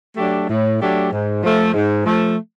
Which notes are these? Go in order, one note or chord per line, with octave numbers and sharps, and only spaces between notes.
F#3 A3 D4 G4
A2
F#3 A3 D4 G4
G#2
F3 A3
G#2
F3 A3